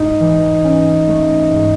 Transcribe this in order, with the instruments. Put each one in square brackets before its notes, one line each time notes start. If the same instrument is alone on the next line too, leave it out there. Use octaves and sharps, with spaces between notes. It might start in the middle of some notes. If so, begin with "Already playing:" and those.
Already playing: [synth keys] G#2 [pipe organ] D#4
[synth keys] E3
C#4
A3
G#2